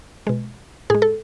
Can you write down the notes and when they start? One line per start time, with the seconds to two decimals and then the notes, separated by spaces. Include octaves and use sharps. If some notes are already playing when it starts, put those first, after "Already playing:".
0.27 B2 G#3
0.90 A2 G#3 G#4
1.02 A4